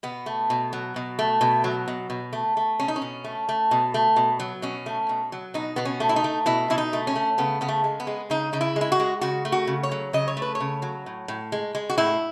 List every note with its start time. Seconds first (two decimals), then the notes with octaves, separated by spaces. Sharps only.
0.03 B2 B3
0.26 A3
0.50 B2
0.73 F#3
0.96 B2
1.19 A3
1.41 B2
1.64 F#3
1.88 B2
2.10 B2
2.33 A3
2.57 A3
2.79 B2 C#4
2.88 D#4
2.96 C#4
3.02 B2
3.24 A3
3.49 A3
3.71 B2
3.94 A3
4.16 B2
4.40 F#3
4.62 B2 C#4
4.86 A3
5.09 B2
5.32 F#3
5.54 B2 D#4
5.76 B2 B3
5.85 C#4
6.00 A3
6.09 E4
6.16 D#4
6.24 A3
6.46 B2 E4
6.70 B2 E4
6.78 D#4
6.93 A3
7.07 C#4
7.15 A3
7.38 C#3 B3
7.61 C#3 B3
7.68 A3
7.84 G#3
8.00 B3
8.07 G#3
8.30 C#3 D#4
8.53 C#3 D#4
8.61 E4
8.76 G#3
8.81 E4
8.92 F#4
9.00 G#3
9.21 C#3 F#4
9.45 A3
9.52 F#4
9.67 C#3
9.83 C#5
9.92 F#3
10.13 C#3 D#5
10.28 C#5
10.37 A3
10.42 B4
10.55 C#5
10.60 C#3
10.82 F#3
11.06 A2
11.28 A2
11.52 G#3
11.75 G#3
11.90 F#4
11.98 A2 E4